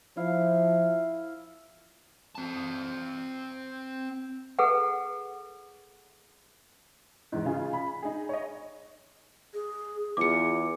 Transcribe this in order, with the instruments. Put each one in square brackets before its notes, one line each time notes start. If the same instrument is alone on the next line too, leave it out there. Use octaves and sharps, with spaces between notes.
[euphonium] F3 [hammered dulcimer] E4 F5
[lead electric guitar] C4 A5
[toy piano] G#4 A4 B4 F#5
[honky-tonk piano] E2 G#2
C#3 F4 G#4
B5
D#4 G#4
C#5 D#5
[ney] G#4
[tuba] E2 [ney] F4 [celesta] D6 C#7